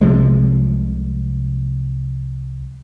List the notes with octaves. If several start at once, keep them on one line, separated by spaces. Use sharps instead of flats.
C2 C3 F3 G#3